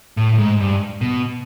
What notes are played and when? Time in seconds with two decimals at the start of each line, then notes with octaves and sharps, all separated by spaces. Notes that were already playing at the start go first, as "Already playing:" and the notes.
0.17 A2
0.33 A2
0.38 G#2
0.60 G2
1.01 B2